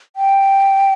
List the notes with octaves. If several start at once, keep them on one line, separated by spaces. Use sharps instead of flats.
G5